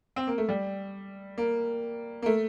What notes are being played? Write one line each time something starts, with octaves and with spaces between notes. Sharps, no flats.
C4
A#3
A3
G3
A#3
A#3
A3